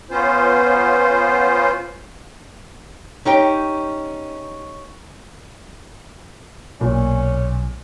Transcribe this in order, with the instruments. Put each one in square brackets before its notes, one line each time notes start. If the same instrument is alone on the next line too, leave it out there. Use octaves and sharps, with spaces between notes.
[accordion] B3 C#4 F4 C5
[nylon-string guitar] C#4 D#4 G4 G5
[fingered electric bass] B1 [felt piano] A#2 [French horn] C#4